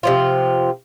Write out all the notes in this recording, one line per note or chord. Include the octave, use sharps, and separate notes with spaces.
C3 F3 F4